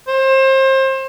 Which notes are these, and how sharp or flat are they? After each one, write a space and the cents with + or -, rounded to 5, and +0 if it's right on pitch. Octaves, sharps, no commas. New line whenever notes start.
C5 +30